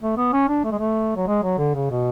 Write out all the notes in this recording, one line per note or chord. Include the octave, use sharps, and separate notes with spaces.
A3
B3
C#4
D4
A3
G#3
A3
F#3
G#3
F#3
D3
C#3
B2